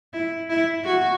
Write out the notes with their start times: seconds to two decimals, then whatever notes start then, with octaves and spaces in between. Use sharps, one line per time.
0.14 E4
0.50 E4
0.85 F#4